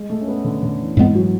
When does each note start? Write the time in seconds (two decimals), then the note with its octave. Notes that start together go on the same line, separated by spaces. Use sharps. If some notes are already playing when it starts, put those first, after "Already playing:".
Already playing: G#3
0.10 A3
0.21 C#4
0.28 B3
0.44 D3
0.62 D3
0.80 E3
0.97 G#2 E3 G#3 B3
1.15 F#3